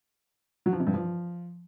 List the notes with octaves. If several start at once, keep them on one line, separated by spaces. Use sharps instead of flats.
F#3
F3
C3
G2
F3